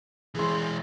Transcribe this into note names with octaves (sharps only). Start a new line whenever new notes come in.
E3 G#3 G#4 C6